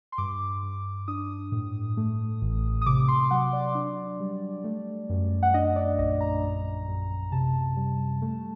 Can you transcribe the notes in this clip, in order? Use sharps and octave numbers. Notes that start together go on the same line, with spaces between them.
C6
G2 D6
G2
D4 D#6
A2
A3
A1
D#6
C3 D6
C6
F#3 F#5
D5
D4
G3
A3
F#2
F#5
D4 D#5
D5
A#1 D#5
A#5
F#2
F#2
C3 A5
G3
A3